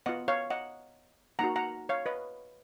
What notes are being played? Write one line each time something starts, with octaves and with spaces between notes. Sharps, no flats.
B3 F4 D#5 F#5
C#5 F5
D#5 F#5
A#3 D#4 F#4 F#5 A#5
F#5 A#5
C#5 F5
B4 D#5